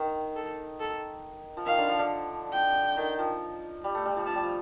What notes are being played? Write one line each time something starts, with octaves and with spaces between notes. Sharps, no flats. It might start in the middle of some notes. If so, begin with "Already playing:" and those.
Already playing: D#3
A4
A4
F3
D#3 F5
D3
F3
D3
G5
D#3
F3
G3
A3
G3
F3
F3 A5
G3
F3